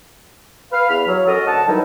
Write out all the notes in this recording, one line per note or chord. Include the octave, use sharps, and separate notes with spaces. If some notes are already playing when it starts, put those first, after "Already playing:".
B4 F5
E2 B5 F6
F#3
C#4 F#4 A4 A#4 D#5
D2 A4 F#5 A5
D#3 E3 F#3 G3 D#4 E4